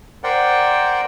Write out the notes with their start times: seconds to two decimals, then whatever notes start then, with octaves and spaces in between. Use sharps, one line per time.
0.24 A#4 C5 D5 F#5 G5